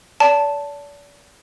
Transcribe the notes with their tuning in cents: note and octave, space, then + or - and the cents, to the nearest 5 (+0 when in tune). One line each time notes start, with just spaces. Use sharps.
D5 -40 A5 +0